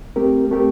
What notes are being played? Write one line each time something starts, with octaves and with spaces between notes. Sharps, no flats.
A3 C4 G4 A#4
A3 C4 G4 A#4